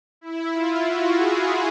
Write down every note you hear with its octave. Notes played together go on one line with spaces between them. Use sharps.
E4
F4
F#4
G#4